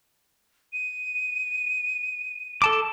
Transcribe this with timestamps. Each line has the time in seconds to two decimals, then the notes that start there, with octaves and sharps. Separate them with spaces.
0.73 D#7
2.62 A4 A5 D6